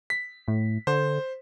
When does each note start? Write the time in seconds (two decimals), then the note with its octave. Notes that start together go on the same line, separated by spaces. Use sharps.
0.10 B6
0.48 A2
0.87 D3 C5